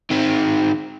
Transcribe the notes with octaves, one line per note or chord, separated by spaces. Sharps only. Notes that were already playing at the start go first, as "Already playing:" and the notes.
D#3 C4